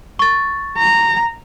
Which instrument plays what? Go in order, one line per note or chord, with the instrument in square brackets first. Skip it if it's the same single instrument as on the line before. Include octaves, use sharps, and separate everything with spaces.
[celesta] C#6 A6
[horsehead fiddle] A#5